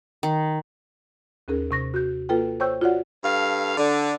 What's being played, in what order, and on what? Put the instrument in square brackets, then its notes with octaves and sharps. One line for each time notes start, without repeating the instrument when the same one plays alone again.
[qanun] D#3
[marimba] D#2 C#4 G#4 A#4
C3 C#6 A#6
F#4 G6
A#3 F4 A4 B4 G5
C5 C#5 G5 C#6 E6 G6
F4 F#4 C#5 D5 F#5
[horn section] G2 A4 F5
D3